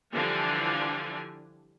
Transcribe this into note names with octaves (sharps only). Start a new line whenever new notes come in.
D3 E3 F3 G3 D4 G#5